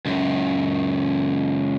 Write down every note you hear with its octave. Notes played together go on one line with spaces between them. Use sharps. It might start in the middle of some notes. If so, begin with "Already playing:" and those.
C#2 F#2